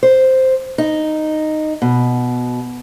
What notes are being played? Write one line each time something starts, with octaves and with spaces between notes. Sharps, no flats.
C5
D#4
B2